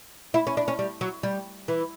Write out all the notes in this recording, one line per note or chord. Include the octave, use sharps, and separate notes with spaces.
E4
C#4
D4
C#4
G3
F#3
G3
E3